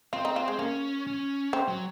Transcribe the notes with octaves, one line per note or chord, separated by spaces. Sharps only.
C4 F4
D#4
F4
G#3
A#3 C#4
C#4
C4
F#3